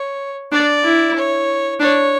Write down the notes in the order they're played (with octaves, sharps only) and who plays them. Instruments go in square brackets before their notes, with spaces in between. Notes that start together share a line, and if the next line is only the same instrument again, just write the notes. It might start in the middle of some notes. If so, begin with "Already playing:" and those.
Already playing: [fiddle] C#5
[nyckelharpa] D4 [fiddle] D5
[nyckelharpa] E4
[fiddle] C#5
[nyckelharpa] D4 [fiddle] C#5